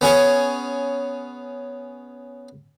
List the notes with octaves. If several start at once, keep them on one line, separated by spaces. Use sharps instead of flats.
B3 C#4 G#4 C#5